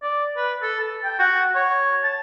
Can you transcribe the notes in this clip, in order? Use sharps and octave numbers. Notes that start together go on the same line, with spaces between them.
D5
B4
A4
A5
G5
F#4
C#5
A5